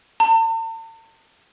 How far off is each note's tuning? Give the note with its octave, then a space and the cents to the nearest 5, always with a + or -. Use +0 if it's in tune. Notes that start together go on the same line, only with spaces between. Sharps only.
A5 +45